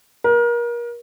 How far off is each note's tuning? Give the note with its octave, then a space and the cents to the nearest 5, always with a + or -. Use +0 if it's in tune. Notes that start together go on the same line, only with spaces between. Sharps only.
A#4 +30